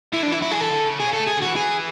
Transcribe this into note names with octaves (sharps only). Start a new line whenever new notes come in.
D3 E4
D4
E3 E4
F#3 E4
G#4
E3 A4
D3
C#3
B2 G#4
C#3
A4
A3
G#4
D3
E3 F#4
G#4